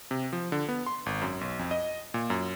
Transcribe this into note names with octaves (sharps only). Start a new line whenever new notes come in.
C3
F3
D3
B3
C6
G#1
F#2
B1
F2
D#5
A#2
F#2